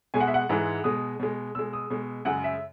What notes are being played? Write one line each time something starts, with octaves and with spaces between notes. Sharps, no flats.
B2 G#3 G#5
F#5
E5
F#5
G#2 E3 G#3
B2 G#3 D#6
B2 G#3
B2 G#3 E6
D#6
B2 G#3
F#2 C#3 G#3 F#5
E5